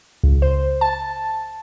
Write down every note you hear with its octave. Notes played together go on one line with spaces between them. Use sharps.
C#2
C5
A5